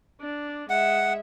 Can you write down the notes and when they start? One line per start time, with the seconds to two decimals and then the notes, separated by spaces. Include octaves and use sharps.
0.21 D4
0.70 G#3 E5 F#5